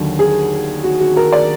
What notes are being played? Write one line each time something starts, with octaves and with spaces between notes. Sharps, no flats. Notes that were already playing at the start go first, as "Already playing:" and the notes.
Already playing: D#2 D3 F#3
G#4
F#4
F#4
A#4
D5